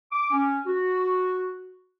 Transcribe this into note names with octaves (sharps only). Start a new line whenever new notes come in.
D6
C#4
F#4